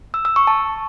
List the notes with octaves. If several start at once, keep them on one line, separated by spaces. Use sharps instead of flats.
E6
E6
C#6
A5